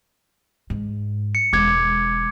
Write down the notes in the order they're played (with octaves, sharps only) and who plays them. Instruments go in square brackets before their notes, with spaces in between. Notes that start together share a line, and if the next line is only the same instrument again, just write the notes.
[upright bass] G#2
[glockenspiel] C#7
[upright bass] E1 G#3 [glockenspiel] D6 G#6